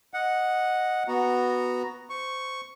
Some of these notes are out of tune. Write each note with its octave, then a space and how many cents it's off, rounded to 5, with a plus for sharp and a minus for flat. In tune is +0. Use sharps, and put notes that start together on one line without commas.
D#5 +0 F#5 -5
B3 +0 F#4 +0 A#5 +0
C5 -20 C#6 +0